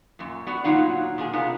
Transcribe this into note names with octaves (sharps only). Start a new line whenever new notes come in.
F#2 A#2
B3 F#4 D5
A#2 F3 F#3 D#4 F4 F#5
A#2 D4 G#4
C3 B3 D4 F4 A#4 A#5